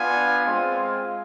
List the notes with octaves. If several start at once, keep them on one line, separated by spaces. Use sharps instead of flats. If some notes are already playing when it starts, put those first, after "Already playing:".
Already playing: B3 D4 F4 G#5
G#3 C4 F4